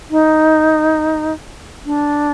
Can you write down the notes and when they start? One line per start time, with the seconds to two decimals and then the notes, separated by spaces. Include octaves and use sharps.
0.10 D#4
1.85 D4